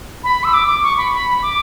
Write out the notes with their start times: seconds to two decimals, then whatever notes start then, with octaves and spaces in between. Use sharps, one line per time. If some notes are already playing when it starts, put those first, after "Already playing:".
0.24 B5
0.44 E6
0.53 D6
0.67 D6
0.83 C#6
0.97 B5
1.13 B5
1.42 D6